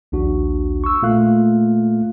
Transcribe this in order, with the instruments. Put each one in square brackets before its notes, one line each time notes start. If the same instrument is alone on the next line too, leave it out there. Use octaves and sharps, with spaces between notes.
[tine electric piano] A#1 D#2 D4 F#4
C#6 E6
A#2 A3 A#3 F4 F5 F#6